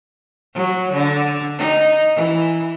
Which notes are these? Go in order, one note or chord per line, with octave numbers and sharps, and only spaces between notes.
F#3
D3
D#4
E3